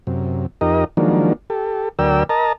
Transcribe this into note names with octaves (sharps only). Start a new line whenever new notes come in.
F#2 C3
F2 D#4 G4 A#4 D#5
D#3 F3 F#3 G#3 A#3 D4
G4 A4
D2 F#3 A#4 D5 G5 E6
A#4 D#5 A5 A#5